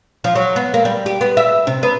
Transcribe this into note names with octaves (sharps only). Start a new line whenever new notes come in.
F3
F#3
B3
A#3
G3
G4
B3
E5
C3
B3